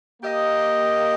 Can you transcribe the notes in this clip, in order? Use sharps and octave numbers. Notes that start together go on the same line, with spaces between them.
A#3 G4 D#5